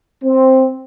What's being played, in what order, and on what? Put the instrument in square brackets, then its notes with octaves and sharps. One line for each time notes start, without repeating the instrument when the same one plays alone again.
[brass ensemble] C4